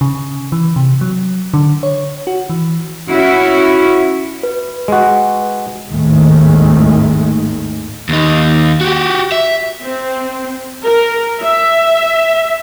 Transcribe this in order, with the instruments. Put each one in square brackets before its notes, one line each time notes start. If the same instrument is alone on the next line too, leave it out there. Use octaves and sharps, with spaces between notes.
[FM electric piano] C#3
E3
C3
F#3
D3
C#5
F#4
E3
[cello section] C#4 E4 F#4
[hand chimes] B4
[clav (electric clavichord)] G#3 F#4
[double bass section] G#1 D#2 A2 D#3 G#3 A3
[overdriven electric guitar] D#2 D#4
F#4 G4
E5
[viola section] C4
A#4
E5